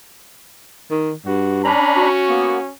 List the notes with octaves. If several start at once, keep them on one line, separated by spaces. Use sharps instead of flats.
D#3
G2 F#4
C#4 D4 A#5 B5
F#4
A#3 B3